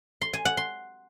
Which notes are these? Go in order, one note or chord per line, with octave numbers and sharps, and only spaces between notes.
C6
G#5
F#5
C6